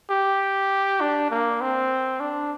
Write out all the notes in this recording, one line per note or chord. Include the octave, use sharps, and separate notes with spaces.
G4
D4
A#3
C4
D4